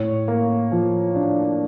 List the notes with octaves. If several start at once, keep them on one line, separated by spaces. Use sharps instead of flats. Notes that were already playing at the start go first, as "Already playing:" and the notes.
Already playing: A2 C#5
A#3
F3
D4